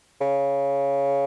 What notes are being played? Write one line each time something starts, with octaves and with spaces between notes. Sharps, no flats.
C#3